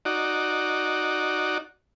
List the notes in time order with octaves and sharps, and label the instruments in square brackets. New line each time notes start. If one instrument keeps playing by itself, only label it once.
[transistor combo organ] D#4 F#4 D5